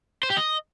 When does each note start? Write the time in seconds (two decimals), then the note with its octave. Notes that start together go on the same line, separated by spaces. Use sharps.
0.23 C5
0.30 G4
0.37 D#5